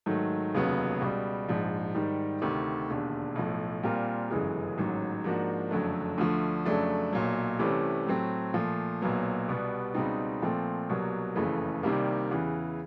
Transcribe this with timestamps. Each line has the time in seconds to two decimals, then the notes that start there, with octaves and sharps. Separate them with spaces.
0.06 G#2 D#3 F#3 A3
0.54 F1 D#2 C#3 F#3 B3
1.00 C#2 B2 G3
1.48 A#1 G#2 F3
1.94 G#2 D#3 G3
2.41 D2 C3 D#3
2.90 E1 D#2 D3
3.35 B1 A2 F3
3.83 A#2 G3 C4 F4 A#4
4.30 G1 F#2 C#3 E3 G#3
4.78 A1 G#2 D#3 F#3
5.24 G#2 F3 A#3 D4 F#4
5.71 F#1 F2 D3 F#3 A3
6.18 D2 D3 F3 A3
6.65 F2 C#3 F#3 A3 D4
7.13 B1 A#2 F#3
7.59 C2 C3 E3 A3 C#4
8.06 A2 F#3 A3 C4
8.54 A#2 F3 A3
9.01 B1 A#2 F#3 B3
9.48 C2 B2 G3 B3
9.94 C#2 B2 G3 C4 D#4
10.42 A#2 F3 A3 C4
10.89 C2 B2 F#3 A#3
11.36 F#1 F2 C#3 E3 A3
11.83 C2 C3 D#3 G3 A#3
12.31 E2 C#3 E3